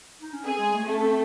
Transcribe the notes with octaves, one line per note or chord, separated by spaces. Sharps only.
D#4
C#4
C4 G#4
G#3
A3
A3 C4
C#4
C4